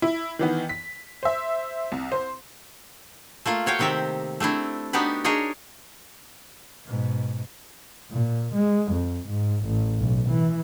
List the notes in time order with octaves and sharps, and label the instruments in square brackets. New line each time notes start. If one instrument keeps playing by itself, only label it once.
[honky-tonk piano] E4
D#3 E3 B3
B6
C5 E5
C2
C5
[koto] A3 A#3 F4
F#4 C#5 F5 G5
C3 D#3 C4 G4 E5
A3 C4 D4 E4
B3 D4 D#4 F#4 G4 B4
D4 D#4 G#4 A#4 C#5 D#5
[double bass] G#2 B2
A#2
G#3
F2
G#2
A1
B1
E3